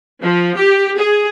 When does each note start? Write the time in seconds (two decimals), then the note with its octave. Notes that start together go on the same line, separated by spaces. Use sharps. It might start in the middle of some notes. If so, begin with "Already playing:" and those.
0.22 F3
0.57 G4
0.97 G#4